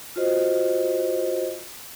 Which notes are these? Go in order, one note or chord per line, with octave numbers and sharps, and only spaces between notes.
F4 F#4 C5 D#5